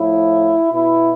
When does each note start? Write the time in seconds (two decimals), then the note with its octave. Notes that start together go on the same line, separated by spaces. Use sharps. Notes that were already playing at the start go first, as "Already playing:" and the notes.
Already playing: A2 F3 E4
0.71 B2 E4